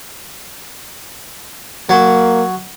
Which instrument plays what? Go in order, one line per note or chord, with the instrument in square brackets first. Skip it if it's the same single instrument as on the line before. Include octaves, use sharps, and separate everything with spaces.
[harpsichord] F#3 [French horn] A#3